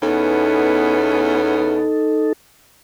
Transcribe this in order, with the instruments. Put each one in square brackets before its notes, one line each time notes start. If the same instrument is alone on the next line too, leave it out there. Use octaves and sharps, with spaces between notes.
[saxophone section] E2 B3 C#4 [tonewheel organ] D#4 A4